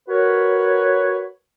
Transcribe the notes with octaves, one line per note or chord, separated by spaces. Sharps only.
F#4 A#4 B4 C#5